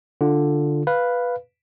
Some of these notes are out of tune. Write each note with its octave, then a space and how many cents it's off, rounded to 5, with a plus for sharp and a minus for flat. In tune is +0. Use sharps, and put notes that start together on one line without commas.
D3 +0 F4 +0
B4 +0 F5 +0